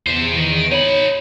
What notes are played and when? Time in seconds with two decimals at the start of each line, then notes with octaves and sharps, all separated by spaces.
0.07 E2 C5 E5
0.37 D#3
0.55 D7
0.72 D#4 C#5 B5